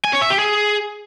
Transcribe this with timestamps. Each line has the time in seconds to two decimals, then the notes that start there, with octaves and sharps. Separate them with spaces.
0.05 G#5
0.13 C#5
0.22 E5
0.30 G4
0.39 G#4